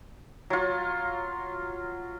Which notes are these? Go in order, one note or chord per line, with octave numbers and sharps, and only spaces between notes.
F#3 F4